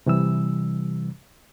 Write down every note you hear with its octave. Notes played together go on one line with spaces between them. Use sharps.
C3 E3 G3 E6